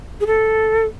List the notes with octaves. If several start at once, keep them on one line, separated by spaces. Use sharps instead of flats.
G#4
A4